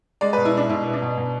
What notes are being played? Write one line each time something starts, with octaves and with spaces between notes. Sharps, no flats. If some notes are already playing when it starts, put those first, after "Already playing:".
G#3 D5
B2 B4
E4
G#3 D4
B2 E4
B3
D4
B2
B2